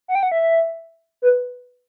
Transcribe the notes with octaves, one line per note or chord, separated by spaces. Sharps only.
F#5
G5
F#5
E5
B4